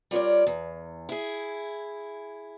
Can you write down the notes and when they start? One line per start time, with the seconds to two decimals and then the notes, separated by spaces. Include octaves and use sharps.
0.11 G3 F4 A#4 C#5 D5
0.47 E2
1.09 E4 G#4